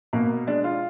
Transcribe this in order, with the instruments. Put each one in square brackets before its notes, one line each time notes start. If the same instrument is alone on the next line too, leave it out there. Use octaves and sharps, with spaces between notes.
[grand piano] B2 A#3
G#3 D4
F4